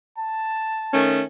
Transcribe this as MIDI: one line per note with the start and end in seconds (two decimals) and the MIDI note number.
0.18 0.99 81
0.93 1.22 51
0.93 1.22 57
0.93 1.22 61